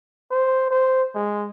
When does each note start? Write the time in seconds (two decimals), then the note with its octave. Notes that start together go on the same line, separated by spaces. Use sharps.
0.31 C5
0.71 C5
1.15 G#3